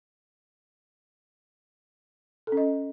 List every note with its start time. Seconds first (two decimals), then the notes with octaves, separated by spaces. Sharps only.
2.47 A4
2.52 C#4
2.57 D#5